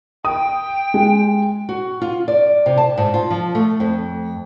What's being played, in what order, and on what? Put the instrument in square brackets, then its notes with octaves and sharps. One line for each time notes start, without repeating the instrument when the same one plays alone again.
[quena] G5 [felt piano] D#6
[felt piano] G#3
[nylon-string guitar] F#4
F4
D5
C3
A5
G#2
F4
F3
A3
F2